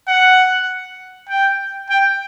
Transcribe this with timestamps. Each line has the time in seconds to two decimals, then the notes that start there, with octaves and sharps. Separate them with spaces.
0.08 F#5
1.29 G5
1.90 G5